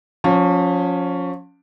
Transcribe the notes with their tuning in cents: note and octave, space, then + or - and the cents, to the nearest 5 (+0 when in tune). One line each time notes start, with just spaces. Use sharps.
F3 +35 C#4 +10